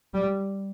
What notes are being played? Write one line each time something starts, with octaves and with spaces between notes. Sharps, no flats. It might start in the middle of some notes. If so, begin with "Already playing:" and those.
G3